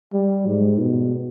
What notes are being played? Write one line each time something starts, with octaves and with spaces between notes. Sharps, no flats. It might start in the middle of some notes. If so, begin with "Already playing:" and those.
G3
G#2
B2